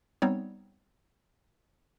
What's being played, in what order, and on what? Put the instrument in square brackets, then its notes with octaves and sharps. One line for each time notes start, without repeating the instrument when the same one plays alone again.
[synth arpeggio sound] G3 B3 C4 D#4 C#5